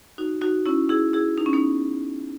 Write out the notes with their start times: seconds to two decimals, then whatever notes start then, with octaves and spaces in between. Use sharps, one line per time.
0.18 D#4 F#4
0.41 D#4 F#4
0.66 C#4 E4
0.89 E4 G#4
1.13 E4 G#4
1.38 D#4
1.46 C#4
1.53 B3 D#4